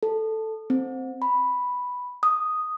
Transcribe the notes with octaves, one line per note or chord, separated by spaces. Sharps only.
A4
C4
B5
D#6